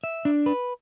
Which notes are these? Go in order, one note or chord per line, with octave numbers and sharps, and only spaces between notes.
E5
D4
B4